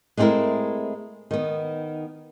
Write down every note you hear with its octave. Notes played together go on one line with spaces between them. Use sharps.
G#3 A3 C4 C#4 E4 A#4
D#3 B3